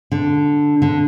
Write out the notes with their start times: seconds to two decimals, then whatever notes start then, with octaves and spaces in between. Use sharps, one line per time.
0.12 D3
0.82 D3